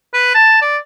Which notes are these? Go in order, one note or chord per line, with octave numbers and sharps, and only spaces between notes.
B4
A5
D5